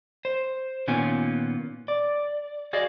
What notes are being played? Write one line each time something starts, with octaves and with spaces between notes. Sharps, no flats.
C5
A#2 D#3 B3 C#4 F4 G#5
D5
F#4 G#4 D5 D#5 F5